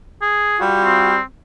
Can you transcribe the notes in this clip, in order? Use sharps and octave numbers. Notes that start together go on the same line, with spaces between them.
G#4
G3 F4 F#4
C4